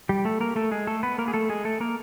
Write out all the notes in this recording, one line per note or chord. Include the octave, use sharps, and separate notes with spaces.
G3 G4
A3 A4
A#3 A#4
A3 A4
G#3 G#4
A3 A4
B3 B4
A#3 A#4
G#4
A3 A4
G#3 G#4
A3 A4
A#3 A#4